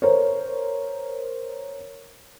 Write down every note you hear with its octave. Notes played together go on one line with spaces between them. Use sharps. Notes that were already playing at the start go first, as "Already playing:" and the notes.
A#4 C5 C#5